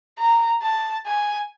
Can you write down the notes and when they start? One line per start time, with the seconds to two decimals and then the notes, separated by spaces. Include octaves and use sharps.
0.19 A#5
0.62 A5
1.06 G#5